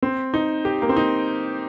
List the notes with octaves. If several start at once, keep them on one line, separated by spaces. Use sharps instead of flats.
C4
D#4
G4
A#3
C4
D#4